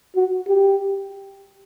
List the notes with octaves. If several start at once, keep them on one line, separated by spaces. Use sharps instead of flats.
F#4
G4